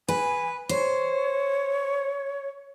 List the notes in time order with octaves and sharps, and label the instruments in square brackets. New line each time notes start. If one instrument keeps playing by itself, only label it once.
[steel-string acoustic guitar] B4 [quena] G#5
[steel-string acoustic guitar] C5 [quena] C#5